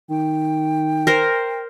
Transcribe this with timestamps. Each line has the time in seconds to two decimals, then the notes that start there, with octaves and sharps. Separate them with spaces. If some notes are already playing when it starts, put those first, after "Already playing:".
0.10 D#3 G5
1.07 A#4 C5